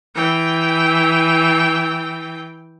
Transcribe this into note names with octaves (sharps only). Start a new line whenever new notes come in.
E3 G5